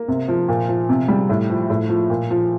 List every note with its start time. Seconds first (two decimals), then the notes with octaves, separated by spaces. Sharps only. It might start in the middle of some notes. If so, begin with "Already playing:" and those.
Already playing: A#3
0.08 C3
0.28 F3
0.48 A#2
0.68 F3
0.89 C3
1.08 G3
1.29 A2
1.50 F3
1.70 A2
1.89 F3
2.10 A#2
2.30 F3